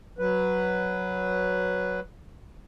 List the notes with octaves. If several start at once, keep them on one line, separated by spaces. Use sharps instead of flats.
F#3 B4